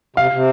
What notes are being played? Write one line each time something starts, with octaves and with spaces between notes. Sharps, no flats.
C3 F5
C3